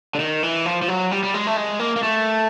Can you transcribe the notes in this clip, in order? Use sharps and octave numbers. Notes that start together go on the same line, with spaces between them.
D3
D#3
E3
F3
F3
F#3
G3
G3
G#3
A3
G#3
A#3
A#3
A3